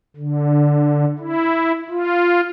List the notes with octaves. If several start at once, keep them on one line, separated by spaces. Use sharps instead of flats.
D3
E4
F4